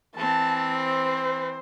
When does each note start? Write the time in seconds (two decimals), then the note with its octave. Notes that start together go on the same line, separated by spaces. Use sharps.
0.16 E3 C4 A5
0.77 C5